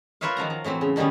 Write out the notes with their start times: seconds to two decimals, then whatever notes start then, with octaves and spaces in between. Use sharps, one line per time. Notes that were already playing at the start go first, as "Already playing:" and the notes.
0.21 F4 A#4 B4 C#5 E5 F5
0.37 D#3 F3 F#3 A#5
0.50 F3
0.64 A2 E3 F#3 C4
0.81 C#3
0.96 D3 D#3 G3 B3 C#4